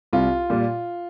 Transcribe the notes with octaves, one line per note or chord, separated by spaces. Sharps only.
C2 F4
A#2 G3